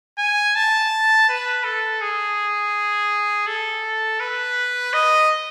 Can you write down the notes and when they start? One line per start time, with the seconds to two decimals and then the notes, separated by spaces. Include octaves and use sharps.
0.19 G#5
0.55 A5
1.29 B4
1.64 A4
2.01 G#4
3.47 A4
4.20 B4
4.94 D#5